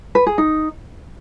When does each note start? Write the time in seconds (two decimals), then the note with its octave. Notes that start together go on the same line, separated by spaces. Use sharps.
0.15 B4
0.26 G#4
0.38 D#4